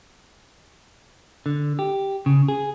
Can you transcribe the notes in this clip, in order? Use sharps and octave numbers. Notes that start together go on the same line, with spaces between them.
D3
G4
C#3
G#4